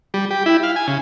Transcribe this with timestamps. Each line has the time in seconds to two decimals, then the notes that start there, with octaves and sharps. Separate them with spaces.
0.14 G3
0.31 G4
0.46 E4
0.63 F5
0.76 G#5
0.88 C#3